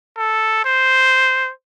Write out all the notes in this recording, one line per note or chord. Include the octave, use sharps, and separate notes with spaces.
A4
C5